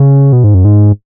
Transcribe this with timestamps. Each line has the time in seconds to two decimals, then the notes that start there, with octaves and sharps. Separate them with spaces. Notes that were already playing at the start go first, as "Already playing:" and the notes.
Already playing: C#3
0.32 B2
0.44 G#2
0.54 F#2
0.65 G#2